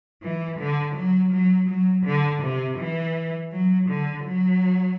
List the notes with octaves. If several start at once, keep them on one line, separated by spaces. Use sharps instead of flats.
E3
D3
F#3
F#3
F#3
D3
C3
E3
F#3
D3
F#3